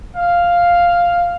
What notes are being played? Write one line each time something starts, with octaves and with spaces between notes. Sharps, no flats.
F5